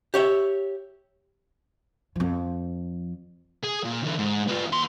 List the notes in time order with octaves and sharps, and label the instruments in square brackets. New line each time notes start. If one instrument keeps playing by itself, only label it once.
[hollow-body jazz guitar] G4 C#5 E5
[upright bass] F2 F3
[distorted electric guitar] G#4
A#2
D3 E3
G#2
B3 F4
D#2 C6